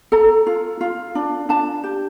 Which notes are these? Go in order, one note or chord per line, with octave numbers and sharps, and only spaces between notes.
A4 A#5
F4
F4
D4
D4 A5
G4